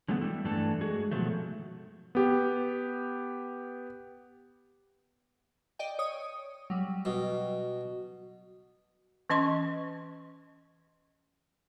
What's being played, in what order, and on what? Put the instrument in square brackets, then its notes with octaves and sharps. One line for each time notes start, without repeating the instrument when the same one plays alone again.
[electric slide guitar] D3 E3 F#3 G#3 A3 B3
G3 E4
G2 E3 A3 D4 A4
G#3 F#4 G#4
B2 D#3 F3 F#3 A3
[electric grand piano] B3 G4
[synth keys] D5 D#5 G5
C#5 D#6
F#3 G3
[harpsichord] B2
[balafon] E3 C#4 D#5 C6 C#6